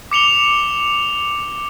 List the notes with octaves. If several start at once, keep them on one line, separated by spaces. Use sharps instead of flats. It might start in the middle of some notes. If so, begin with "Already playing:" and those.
D6 C#7 F7 G7